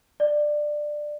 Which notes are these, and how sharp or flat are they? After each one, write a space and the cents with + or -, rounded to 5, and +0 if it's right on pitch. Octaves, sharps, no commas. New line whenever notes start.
D5 +15